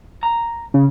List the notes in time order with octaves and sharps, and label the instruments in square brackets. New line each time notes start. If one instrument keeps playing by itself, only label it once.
[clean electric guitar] A#5
[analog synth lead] C#3